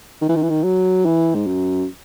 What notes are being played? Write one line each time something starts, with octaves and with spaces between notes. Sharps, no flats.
D#3
E3
D#3
E3
D#3
F#3
E3
G#2
F#2